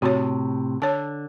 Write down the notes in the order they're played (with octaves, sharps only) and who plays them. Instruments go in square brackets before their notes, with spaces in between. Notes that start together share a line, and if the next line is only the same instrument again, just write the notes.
[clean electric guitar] A2 C3 [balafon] F#4 C#5
[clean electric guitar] D3 [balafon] C#5 A5